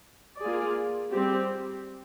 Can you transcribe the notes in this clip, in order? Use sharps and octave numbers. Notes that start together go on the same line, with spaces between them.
A#3 F4 G#4 D5
G3 C4 G4